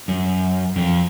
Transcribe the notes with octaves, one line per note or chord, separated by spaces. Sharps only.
F#2
F2